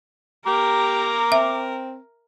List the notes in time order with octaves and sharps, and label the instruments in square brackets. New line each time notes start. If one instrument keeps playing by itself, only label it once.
[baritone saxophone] G4 [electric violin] A#4 [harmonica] A#5 D6
[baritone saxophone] C4 [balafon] E5